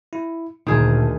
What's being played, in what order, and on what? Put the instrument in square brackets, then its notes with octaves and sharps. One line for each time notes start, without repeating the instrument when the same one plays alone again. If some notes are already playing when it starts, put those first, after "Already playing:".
[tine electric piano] E4
[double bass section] D2 A3 [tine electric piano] A#2 [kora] D#3 G#4